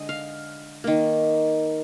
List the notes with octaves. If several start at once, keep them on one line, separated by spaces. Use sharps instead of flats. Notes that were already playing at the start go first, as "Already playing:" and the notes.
Already playing: D3 G#3 D#5
F5
D#3 A#3